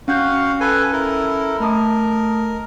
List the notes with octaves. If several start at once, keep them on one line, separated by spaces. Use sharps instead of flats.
C#4 F#4 F5 F#5 G6
A4 B4 G#5
E4 A4 A#4
A3 A#4 A5 D#6